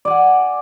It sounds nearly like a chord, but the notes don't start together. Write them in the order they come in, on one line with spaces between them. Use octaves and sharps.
D5 G#5 F#5